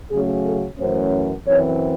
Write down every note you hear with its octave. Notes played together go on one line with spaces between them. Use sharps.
C#3 F#3 A3 C#4 G#4
A4
F#2 E3 A3 C#4 C5
F#2 E3 C4 C#5